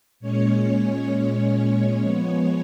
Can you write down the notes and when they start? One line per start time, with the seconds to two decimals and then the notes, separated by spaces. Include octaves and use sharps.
0.20 A#2 G#3 C#4 C#5
1.10 C#5
2.00 F3 G#3 B3 C#5